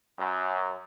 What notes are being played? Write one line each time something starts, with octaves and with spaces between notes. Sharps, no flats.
F#2